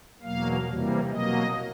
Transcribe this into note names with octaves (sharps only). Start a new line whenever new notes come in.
E2 B2 F#3 A#3 F5
C3 E3 G3 A#3
B2 F#3 A#3 D#5